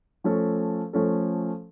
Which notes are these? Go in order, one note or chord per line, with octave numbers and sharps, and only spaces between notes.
F3 A3 C#4 A4
F3 A3 C#4 A4